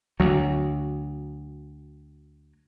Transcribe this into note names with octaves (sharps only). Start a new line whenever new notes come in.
D2 F#3